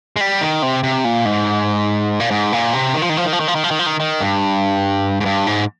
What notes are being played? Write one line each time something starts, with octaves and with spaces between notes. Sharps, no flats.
G#3
G3
D#3
C3
C3
A#2
G#2
A#2
G#2
A#2
C3
D#3
F3
D#3
F3
D#3
F3
D#3
F3
D#3
F3
D#3
F3
D#3
D#3
G2
G#2
G2
G#2